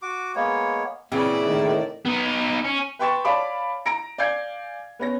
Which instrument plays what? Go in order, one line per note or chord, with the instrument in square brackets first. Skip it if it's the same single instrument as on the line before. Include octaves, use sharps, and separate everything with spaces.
[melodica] F#4 D6
G#3 A#3 B3 C#5
[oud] A#2 C#3 E3 [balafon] C4 [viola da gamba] E4 D5
[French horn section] A2 D#3
[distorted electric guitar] B3 D#4
C#4
[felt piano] B4 G5 C6 C#6 A6 E7
C#5 D5 F5 A5 B5 D6
A#5 A#6 D7
D5 F5 G#5 G6 G#6 C7
B3 C#4 A#6